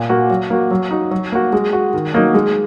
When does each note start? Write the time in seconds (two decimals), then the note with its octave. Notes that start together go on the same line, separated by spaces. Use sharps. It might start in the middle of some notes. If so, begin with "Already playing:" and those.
Already playing: A#2
0.09 A#3 F#4
0.30 F#3
0.50 A#3 F#4
0.71 F#3
0.91 D#4 F#4
1.11 F#3
1.32 A#3 F#4
1.53 G#3
1.73 F#4
1.94 D#3
2.14 F#3 A#3 D#4 F#4
2.34 G#3